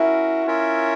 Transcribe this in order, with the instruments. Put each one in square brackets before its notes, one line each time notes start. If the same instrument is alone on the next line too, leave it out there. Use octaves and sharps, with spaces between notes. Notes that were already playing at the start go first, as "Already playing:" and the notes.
Already playing: [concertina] C#4 F#4 A#4 [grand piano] E4
[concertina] C#4 F4 A#4 C#5 E5